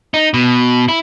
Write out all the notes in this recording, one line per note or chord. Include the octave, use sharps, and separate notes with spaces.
D#4
B2
E4